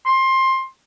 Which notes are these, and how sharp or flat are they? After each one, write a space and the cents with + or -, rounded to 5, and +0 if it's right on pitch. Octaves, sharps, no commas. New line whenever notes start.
C6 +20